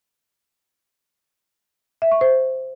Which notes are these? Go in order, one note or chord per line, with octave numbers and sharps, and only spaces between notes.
E5
C#6
C5